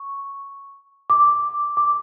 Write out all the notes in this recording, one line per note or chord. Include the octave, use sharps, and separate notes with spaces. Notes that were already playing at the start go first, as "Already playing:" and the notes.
Already playing: C#6
D6
D6